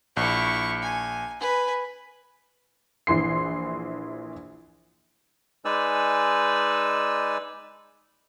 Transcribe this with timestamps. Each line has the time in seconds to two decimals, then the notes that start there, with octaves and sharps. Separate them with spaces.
0.17 A#1 E4 C#6
0.83 G#5
1.40 B4 G#5
3.07 A#1 E3 C6 C7
5.65 G#3 D#4 B4 D5 G#5 E6